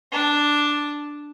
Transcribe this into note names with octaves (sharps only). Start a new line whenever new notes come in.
D4 A5